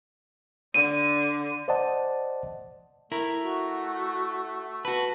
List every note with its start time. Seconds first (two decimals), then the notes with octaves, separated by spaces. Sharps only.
0.74 D3 D#7
1.68 C5 D5 D#5 F#5 A5
3.12 A3 E4 A#4
3.43 F#4
4.85 F#4 B4 A5